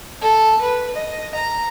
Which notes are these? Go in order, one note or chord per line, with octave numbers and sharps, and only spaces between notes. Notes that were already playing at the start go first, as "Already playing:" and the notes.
A4
B4
D#5
A#5